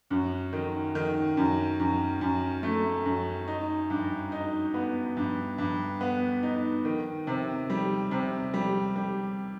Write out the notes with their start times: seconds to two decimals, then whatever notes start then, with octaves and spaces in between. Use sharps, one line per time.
0.11 F#2
0.53 D#3
0.95 D#3
1.37 F#2
1.79 F#2
2.21 F#2
2.63 A3
3.06 F#2
3.48 D#4
3.90 G2
4.32 D#4
4.74 B3
5.17 G2
5.58 G2
6.01 B3
6.43 D#4
6.85 D#3
7.27 C3
7.70 G3
8.11 C3
8.54 G3
8.96 G3